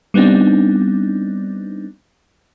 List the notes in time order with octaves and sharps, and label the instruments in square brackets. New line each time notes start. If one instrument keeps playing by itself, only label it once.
[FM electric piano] G3 B3 C4 D4 D#4